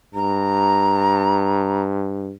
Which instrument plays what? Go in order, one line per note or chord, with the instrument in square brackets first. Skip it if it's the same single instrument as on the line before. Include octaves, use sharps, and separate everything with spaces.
[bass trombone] G2 [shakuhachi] A#5